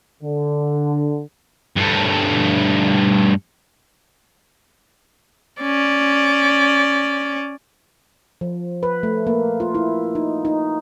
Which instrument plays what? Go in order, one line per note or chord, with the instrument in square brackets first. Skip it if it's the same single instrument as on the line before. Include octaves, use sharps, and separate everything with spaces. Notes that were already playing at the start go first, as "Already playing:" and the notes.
[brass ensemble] D3
[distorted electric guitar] G2 A3
[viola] C#4 D5
[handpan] F3
B4
A3
A#3
F4
E4
D#4
D#4